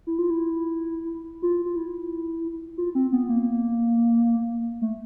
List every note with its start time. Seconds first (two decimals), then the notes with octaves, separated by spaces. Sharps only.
0.07 E4
0.19 F4
0.30 E4
1.42 F4
1.66 F4
1.76 E4
2.78 F4
2.95 C4
3.12 B3
3.29 A#3
4.82 A3